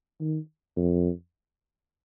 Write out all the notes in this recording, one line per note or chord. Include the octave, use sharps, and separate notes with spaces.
D#3
F2